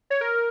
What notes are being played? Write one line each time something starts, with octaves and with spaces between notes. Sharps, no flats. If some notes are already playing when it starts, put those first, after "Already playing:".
C#5
A#4